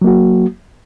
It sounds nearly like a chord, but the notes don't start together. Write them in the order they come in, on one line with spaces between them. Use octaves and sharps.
F#3 A#3 F#4